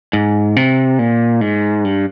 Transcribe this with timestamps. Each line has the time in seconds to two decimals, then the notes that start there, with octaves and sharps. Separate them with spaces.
0.13 G#2
0.56 C3
0.99 A#2
1.41 G#2
1.85 G2